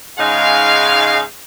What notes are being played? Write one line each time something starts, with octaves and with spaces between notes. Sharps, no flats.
G#2 C#3 G#3 D#4 F5